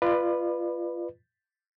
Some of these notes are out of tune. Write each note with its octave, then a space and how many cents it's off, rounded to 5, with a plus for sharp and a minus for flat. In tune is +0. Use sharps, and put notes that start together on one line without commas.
F4 -20 B4 +0 D5 +35